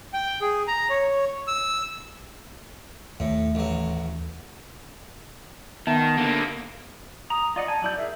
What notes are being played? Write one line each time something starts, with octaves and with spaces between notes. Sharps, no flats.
G5
G#4
A#5
C#5
E6
D#2 A2
A1 F#3
D#3 B3 E5 A5
D3 A#3
A#5 D#6
F4 D5 D#5 F#5
G#5 A5
F#3 E4 D5 G6
G#4 A#4 E5